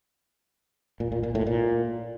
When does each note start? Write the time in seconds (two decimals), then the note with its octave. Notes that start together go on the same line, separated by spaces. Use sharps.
1.00 A#2
1.12 A#2
1.23 A#2
1.35 A2
1.47 A#2